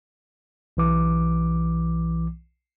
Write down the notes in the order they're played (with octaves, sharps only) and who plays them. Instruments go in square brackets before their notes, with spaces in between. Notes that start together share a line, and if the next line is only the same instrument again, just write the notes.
[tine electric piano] B1 E3 D6